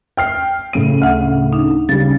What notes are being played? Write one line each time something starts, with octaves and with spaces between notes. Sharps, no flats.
G5 F6 C7
A2 C#3 D#7
D2 E5 F#5
D4 D#4
C#3 G3 A6